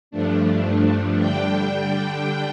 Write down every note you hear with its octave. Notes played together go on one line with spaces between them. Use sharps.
G2 F3 A3 D4
D3 G3 D4 G5